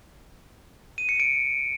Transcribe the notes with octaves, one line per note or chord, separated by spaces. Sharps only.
D#7
C#7
D7